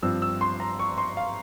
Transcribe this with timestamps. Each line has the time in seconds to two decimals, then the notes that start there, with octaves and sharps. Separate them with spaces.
0.03 G2 F3 C4 E6
0.22 E6
0.41 C6
0.60 A#5
0.79 C#6
0.98 C6
1.17 F5